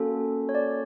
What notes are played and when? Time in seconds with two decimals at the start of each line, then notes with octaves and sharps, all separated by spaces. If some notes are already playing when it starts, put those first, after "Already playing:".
Already playing: A#3 C#4 F#4 A4
0.49 C#5
0.55 D5